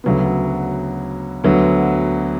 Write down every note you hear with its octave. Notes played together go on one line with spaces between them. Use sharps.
D2 C#3 F#3 B3
D2 D3 F#3 B3